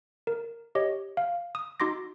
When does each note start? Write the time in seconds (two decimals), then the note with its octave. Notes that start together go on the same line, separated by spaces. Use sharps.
0.27 A#4
0.75 G4 C#5 D#5
1.17 F5
1.55 D#6
1.80 D#4 F#4 C6 D6 A#6